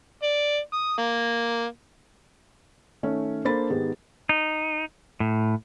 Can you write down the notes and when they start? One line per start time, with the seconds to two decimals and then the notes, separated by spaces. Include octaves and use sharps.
0.23 D5
0.73 D#6
0.98 A#3
3.03 D#3 A3 C#4
3.45 A#3 D4 A4 C5 B5 A6
3.69 G#2 D#3 B3 G4 G#4
4.29 D#4
5.20 A2